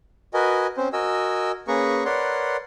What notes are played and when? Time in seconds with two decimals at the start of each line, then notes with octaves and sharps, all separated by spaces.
0.34 F#4 A#4 B4 D#5 G#5
0.77 C4 C#4 C5
0.93 F#4 A#4 D#5 G#5 E6
1.68 A#3 C#4 G#4 B4 A#5 C#6
2.05 A#4 B4 C#5 D5 F#5 C6